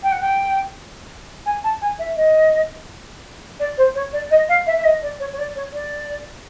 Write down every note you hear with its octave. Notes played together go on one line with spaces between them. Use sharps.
G5
F#5
G5
G#5
A5
G#5
E5
D#5
D5
C5
C#5
D5
D#5
F5
E5
E5
D#5
D5
C#5
C#5
D5
C#5
D5